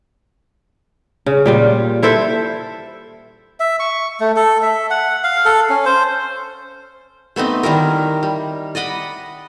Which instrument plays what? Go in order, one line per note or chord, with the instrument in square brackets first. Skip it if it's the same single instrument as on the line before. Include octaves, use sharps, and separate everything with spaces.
[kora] C#3
A#2 G3 F4
E4 A4 C5 E5
[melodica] E5
C#6
A3
A4
E5
F#5
F5
A4
C#4
C5
[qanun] A3 B3 C4 D#4
D#3 G3 E4 A#4
G3
D5 D#5 F#5 B5